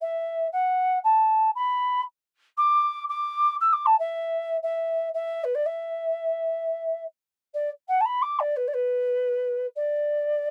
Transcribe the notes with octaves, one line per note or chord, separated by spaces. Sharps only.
E5
F#5
A5
B5
D6
D6
E6
D6
A5
E5
E5
E5
B4
D5
E5
D5
F#5
A5
B5
D6
D5
B4
D5
B4
D5